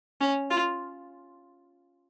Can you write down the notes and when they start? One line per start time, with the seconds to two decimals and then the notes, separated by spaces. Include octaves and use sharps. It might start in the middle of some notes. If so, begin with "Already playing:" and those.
0.21 C#4
0.50 F4